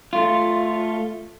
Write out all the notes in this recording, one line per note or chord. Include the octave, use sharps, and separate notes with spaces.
A3 F4